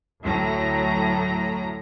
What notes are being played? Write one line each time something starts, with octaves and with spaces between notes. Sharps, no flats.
D2 A2 F#3 A#5